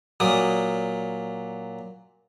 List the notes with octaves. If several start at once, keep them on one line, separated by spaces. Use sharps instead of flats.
A#2 F#3 D5 D#6